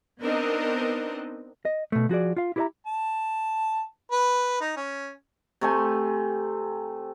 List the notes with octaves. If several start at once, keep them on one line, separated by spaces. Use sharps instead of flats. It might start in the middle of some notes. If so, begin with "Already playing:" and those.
B3 C4 D4 D#4 A#4 D#5
D#5
B2 A3
F3 F#4 G#4 D5
F4 F5
E4 G4 A#4 D5 E5 A#5
A5
B4
D#4
C#4
C3 A3 G#5